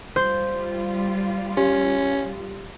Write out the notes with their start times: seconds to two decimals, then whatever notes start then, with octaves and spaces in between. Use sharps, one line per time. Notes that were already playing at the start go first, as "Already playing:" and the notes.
0.16 G3 F4 C5
1.57 C#4 G4